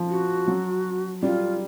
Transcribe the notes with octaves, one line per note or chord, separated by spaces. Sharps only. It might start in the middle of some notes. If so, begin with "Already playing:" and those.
Already playing: F3
F#4
F#3
G3 F4